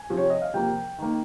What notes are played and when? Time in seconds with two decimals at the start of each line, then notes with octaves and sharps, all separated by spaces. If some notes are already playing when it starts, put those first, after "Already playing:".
Already playing: G#5
0.10 C3 F3 C4
0.17 C#5
0.30 D#5
0.42 F5
0.54 C3 F3 A#3 G5
0.98 D#3 A#3